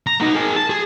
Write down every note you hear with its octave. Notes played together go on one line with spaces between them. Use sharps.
A#5
B3 D#4
G#4 A#4
A5
G#4